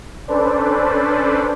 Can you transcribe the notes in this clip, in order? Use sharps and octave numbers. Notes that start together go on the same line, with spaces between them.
C#4 D4 A4 B4 C5 D5